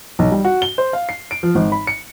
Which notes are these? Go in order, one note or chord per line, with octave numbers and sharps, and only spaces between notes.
B1
G3
F#4
G7
C5
F5
C7
D7
F3
G#1
B5
C#7